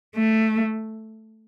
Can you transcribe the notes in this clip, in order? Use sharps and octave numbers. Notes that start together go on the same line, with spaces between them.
A3